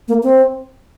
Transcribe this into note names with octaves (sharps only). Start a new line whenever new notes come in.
A#3
C4